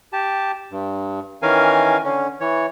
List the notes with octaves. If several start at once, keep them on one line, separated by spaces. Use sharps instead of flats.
G4 A5
G2
D#3 E3 C#4 A#4 F5 G#5
D3 C#4
E3 C#5